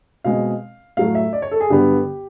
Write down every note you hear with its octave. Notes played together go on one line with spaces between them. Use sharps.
B2 G#3 C4 F5
A2 F#3 A3 F5
E5
D5
C#5
A4
G#4
G2 D3 F#3 B3 G4